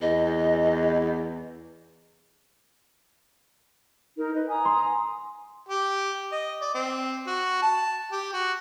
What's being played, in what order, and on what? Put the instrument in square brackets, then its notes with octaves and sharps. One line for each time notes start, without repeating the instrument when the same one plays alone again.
[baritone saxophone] E2 [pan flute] D#5
[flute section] D#4 A#4
B4 D#5
G#5 A#5 D#6
[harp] C6
[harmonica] G4
D#5
D5
C4
F#4
A5
G4
F#4